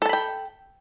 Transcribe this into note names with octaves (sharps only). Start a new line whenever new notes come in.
A4 G5 A5 B5